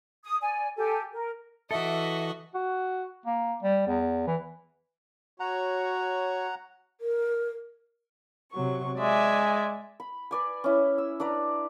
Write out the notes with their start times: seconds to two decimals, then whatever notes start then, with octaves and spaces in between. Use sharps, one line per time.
0.23 D#6
0.41 D5 G#5
0.76 G4 A4 G#5
1.13 A#4
1.71 E3 F#4 A4 D#5 E5
2.55 F#4
3.26 A#3
3.62 G3
3.87 E2
4.27 E3
5.40 F#4 C#5 F#5 A#5
7.01 A#4
8.52 C3 F#3 C#6
8.97 G#3 D5 E5 G#5
10.00 B5
10.31 B4 D5 G#5
10.64 C#4 E4
10.98 E6
11.20 D4 B4 D5 A#5